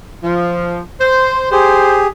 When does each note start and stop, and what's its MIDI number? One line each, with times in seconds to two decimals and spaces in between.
0.24 0.81 53
1.01 1.50 72
1.52 2.07 67
1.52 2.07 68
1.52 2.00 72